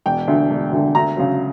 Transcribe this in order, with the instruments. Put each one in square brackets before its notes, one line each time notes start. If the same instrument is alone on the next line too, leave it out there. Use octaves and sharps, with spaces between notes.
[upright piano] E1 G5
D2 D3
E1
D2 D3
D2 A#5
C#3 F#3